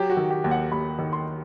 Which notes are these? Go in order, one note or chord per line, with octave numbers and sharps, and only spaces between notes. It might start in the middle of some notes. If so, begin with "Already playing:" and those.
Already playing: F#3 G4
F#4
D#3
G4
D#2
F#5
D#2 B5
D#3
C6